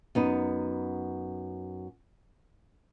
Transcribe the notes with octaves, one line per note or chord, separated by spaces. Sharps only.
F#2 B3 D#4